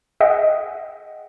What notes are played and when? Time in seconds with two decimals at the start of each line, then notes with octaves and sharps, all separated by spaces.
0.20 G#4 D#5 E5 F#5 G5